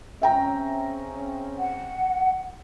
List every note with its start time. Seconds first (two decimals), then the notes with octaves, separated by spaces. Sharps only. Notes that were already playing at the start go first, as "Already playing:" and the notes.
0.22 C#3 C4 C#4 E5 G5 A#5
1.59 F#5